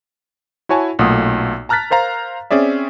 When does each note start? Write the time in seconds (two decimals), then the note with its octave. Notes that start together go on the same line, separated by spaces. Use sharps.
0.69 E4 F#4 C#5 G#5 A5
0.99 B1 A#2 A3 F#5 D#6
1.69 A5 A#5 F6 F#6 A6 B6
1.91 A#4 C5 F5 A#5
2.51 C4 C#4 G#4 D5 E5